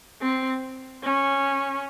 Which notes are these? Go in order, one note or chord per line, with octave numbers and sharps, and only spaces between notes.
C4
C#4